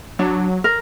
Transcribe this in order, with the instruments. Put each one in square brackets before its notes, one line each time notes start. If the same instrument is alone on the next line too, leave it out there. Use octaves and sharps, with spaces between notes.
[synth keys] F#3 [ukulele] D4
[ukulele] A#4